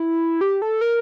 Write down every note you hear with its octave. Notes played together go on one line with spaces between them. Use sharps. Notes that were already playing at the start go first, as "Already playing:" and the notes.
Already playing: E4
G4
A4
A#4